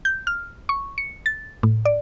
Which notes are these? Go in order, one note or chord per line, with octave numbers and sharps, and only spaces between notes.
G6
F6
C#6
C#7
A6
A2
D5